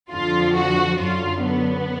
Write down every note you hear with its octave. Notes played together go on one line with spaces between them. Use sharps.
F2 D3 F3 F4
F#4
F#2 D3 F#3 F4
B3